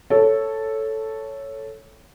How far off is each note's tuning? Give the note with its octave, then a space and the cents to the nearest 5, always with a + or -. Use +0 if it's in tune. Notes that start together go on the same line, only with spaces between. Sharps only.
A4 +0 C#5 +0